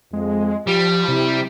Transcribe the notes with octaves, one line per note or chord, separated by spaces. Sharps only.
F2 G#3
F3 G3 G4
C3 E4